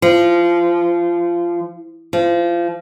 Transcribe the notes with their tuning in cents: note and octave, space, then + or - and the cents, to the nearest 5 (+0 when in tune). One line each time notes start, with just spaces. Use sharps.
F3 -20
F3 -25